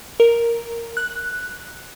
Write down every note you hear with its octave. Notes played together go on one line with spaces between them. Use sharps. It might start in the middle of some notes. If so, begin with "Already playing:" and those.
A#4
F#6